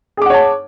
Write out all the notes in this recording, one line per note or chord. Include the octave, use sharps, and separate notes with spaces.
G#4 C#5 F#5 A5 D6